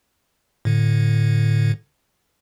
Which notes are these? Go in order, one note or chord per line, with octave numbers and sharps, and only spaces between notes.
A2 D3